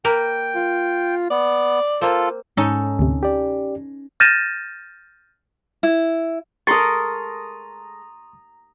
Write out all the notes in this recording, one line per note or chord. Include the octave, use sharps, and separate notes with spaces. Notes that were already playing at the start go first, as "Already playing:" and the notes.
A#3 A#4 B4 G5
F4
B3 D5
A#3 C4 F4 A4
G#2 C#4 D#4 A4
D2 C3
G4 D5
F6 G6 A6 A#6 D#7 E7
E4
G#3 A4 A#4 A#5 C6 C#6 D#6 A6